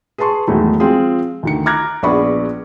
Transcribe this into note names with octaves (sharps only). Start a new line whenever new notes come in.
G#4 B4 A5 C6 C#6
E2 G#2 D#3 F#3 A3
F3 G#3 C4 F4 G#4
D2 D#3 C#7
A#5 D6 F6 F#6 G#6 A#6
A#1 B3 G#4 D5 B5 C#6